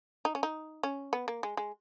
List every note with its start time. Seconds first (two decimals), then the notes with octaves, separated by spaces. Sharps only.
0.25 D#4
0.35 C#4
0.43 D#4
0.83 C#4
1.13 B3
1.28 A#3
1.43 G#3
1.57 G#3